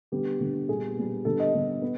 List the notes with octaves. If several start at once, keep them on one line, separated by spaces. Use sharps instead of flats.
D3 G3 B3 G4
D3 G3 B3
A#2 G3 B3 G#4
A#2 G3 B3
D3 G3 B3 A4
D#5
D3 G3 B3
B3